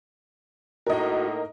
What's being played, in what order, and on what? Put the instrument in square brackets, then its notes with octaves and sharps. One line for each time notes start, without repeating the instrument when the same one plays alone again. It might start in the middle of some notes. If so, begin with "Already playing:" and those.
[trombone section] A2 A#3 D#4 [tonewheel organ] F#4 [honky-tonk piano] A#4 D#5